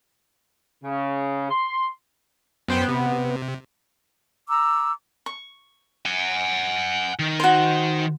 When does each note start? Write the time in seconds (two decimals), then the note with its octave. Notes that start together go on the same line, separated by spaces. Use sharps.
0.84 C#3
1.50 C6
2.68 F#2 B3 C5 G5
2.88 C3
4.48 A#5 D6 E6
5.26 C#6
6.06 F#5 G#5
7.19 D#3
7.40 F#4 C5